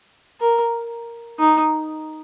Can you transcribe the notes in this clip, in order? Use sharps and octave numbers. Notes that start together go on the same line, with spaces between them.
A#4
D#4